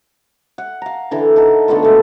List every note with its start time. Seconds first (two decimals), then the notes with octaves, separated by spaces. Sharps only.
0.58 F#5
0.82 F5 A#5
1.11 D3 E3 A#5
1.36 D#4 A4 A#4 F#5
1.68 D3 A3 B3 F4
1.83 B2 G#3 A3